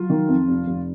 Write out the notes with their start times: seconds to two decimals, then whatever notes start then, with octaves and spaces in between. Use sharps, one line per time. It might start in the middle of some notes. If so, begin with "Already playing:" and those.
Already playing: F#3 F4
0.10 D#3
0.28 F2
0.48 F1
0.66 F1